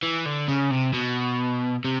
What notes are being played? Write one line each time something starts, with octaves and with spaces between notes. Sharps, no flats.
E3
D3
C#3
C3
B2
C3